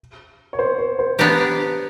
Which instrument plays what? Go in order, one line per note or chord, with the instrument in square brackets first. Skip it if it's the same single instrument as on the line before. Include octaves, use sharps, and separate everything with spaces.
[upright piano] C#5
C5
C5
C5
[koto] B3 D4 G4 A#4 [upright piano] B4